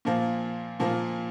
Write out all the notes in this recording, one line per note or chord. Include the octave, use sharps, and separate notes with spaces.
A#2 F3 A#3
A#2 F3 A#3